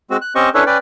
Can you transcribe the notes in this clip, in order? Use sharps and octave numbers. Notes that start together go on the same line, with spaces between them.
G#3 C4 F#4
F#6
C4 C#4 G4 C5 D#5 C#6
C#4 D4 E4 A4 B4 C#5
C#4 B4 D5 G5